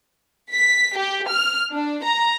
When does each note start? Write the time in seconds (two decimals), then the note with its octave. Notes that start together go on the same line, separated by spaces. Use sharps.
0.51 B6
0.97 G4
1.28 F6
1.73 D4
2.03 A#5